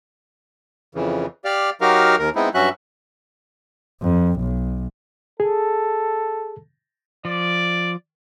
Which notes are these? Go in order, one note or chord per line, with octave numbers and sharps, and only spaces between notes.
F2 C#3 E3
G4 D5 F5
F#3 D#4 F#4 G4 A#4 F5
D#2 A#4
G#3 B3 C4 D#4 E4
G2 F#3 C#4 F#4 E5 F#6
F2
B1
G#4 A4
F3 D5